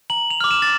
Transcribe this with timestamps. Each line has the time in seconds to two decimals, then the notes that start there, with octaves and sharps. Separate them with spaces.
0.10 A#5 F#7
0.31 F7
0.41 D6 F6
0.51 E7
0.62 A6